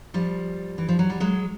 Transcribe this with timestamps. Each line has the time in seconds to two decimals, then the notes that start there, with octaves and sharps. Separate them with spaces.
0.14 F3 G3
0.78 E3
0.88 F3
0.99 F#3
1.10 G3
1.20 F#3 G#3